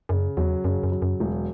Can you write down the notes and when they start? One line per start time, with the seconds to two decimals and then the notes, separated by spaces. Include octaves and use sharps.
0.09 F#2 C#3
0.37 E2 F#3
0.64 F#2 C#3
0.83 F#2
0.92 F#3
1.02 F#2
1.20 E1